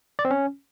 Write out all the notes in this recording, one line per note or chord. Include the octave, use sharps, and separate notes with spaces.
D5
C4
C#4